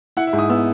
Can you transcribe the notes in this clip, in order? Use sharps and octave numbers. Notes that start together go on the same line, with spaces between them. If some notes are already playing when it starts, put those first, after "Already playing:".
E4 F#5
E5
G#2
D#6
B3 E6